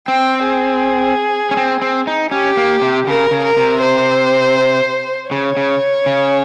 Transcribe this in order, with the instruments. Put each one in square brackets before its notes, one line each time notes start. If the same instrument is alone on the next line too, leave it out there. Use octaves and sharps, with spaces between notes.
[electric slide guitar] C4 [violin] G5
[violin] G#4
[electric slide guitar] C#4
C4
C4
D#4
[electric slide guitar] C#4 [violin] G4
[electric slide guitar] A#3
C3
[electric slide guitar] C#3 [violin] A#4
[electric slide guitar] C#3
[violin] A#4
[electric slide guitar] C3
[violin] C5
[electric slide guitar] C#3 [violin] C#5
[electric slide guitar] C#3
C#3